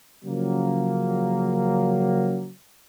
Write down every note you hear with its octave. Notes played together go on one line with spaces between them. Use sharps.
C#3 F3 F#3 A#3